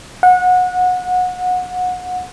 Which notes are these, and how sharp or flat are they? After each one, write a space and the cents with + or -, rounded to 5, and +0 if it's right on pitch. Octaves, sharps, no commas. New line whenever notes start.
F#5 -25